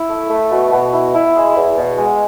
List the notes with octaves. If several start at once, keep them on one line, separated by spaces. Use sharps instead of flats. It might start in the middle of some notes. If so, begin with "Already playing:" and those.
Already playing: E4
A3
A3
B2
B2
E4
E4
G#3
E2
B2
G#3